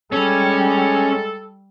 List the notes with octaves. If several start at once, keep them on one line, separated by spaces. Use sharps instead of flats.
G3 G#3 C#4 A4